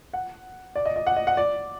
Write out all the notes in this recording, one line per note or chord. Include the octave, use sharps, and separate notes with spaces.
F#5
D5
D#5
D#5
F#5
D#5
F#5
D5